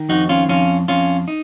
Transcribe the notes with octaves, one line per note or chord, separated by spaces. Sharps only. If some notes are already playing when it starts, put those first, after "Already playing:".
Already playing: D#3
F2 D#4 F#4
C#4 F4
F2 C#4 F4
F2 C#4 F4
D#4